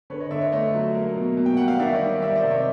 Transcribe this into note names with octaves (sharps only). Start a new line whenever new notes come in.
D3 B4 C#5
C#5 D#5
D3 D5 E5
C#5 D#5
A3 C#5 D#5
F#3
A#3
B2
B2
G5
G3 F#5
F5
D#3 D5 E5
C#5 D#5
G3
G3 D5 E5
C5 D5
C3
C#5 D#5